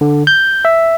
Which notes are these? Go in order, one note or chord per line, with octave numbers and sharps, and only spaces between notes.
D3
G6
E5